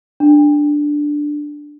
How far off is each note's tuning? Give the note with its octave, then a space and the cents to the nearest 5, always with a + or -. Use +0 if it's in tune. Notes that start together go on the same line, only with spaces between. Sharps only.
D4 +5